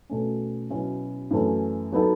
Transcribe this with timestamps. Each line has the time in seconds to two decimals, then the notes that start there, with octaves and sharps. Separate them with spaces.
0.10 B2 A3 C#4
0.70 B2 F#3 C#4 E4
1.31 F#2 E3 A3 C#4
1.92 F#3 B3 D#4 A4